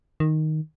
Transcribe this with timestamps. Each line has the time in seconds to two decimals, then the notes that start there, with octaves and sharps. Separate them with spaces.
0.20 D#3